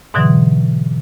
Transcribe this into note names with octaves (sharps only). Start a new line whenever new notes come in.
G#2 B2 D3 E3 F#3